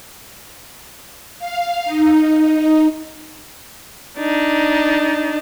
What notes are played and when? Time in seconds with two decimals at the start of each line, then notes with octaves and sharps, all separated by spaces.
1.39 F5
1.85 D#4
2.38 D#4
4.19 D4 D#4